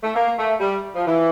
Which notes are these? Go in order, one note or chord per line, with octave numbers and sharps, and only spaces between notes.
A3
A#3
A3
G3
F3
E3